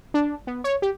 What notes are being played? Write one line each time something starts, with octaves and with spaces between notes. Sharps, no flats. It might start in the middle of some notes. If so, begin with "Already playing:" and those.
D4
B3
C#5
G4